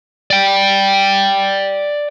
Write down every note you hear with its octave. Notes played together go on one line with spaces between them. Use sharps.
D5 G5